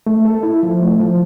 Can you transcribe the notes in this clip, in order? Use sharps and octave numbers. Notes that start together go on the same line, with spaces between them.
A3
A4
E4
F3
A3
F3